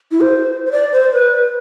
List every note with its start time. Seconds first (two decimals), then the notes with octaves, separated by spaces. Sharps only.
0.11 E4
0.22 C5
0.66 C5
0.71 D5
0.92 C5
1.13 B4